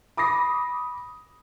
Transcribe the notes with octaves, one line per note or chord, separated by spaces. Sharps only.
B5 D6 D#6 A#6 C7